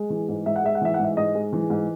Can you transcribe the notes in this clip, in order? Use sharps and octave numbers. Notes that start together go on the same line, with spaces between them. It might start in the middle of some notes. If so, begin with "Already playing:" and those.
Already playing: G#3
E3
G#2
G#2 E5
F#5
G#3 E5
F#5
E3 E5
F#5
G#2 E5
G#2 D#5
G#3
E3
G#2